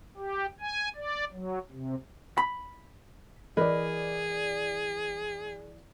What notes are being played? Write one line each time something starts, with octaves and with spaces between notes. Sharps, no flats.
G4
G#5
D5
F#3
C3
B5
E3 G#4 A#4 B4 D5 D#5